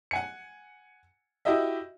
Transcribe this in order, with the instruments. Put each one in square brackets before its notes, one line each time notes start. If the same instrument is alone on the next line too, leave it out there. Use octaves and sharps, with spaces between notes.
[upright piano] F#5 G#5 C#7
E4 F#4 G4 D#5 E5